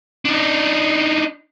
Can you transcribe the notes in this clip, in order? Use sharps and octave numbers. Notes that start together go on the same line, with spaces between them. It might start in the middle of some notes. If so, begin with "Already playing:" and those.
D4 D#4